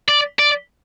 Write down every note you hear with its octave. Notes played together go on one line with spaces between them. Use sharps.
D5
D5